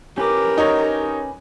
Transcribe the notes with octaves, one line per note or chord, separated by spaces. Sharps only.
C#4 G4 A#4 B4 D6
D#4 C#5